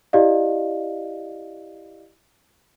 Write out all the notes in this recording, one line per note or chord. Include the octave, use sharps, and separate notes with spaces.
E4 G4 D5 D#5 F5